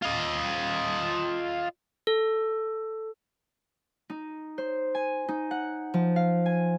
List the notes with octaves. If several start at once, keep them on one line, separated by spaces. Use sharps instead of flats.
F4 D#5
A4
D#4
C5
G#5
D#4
F#5
F3
F5
G#5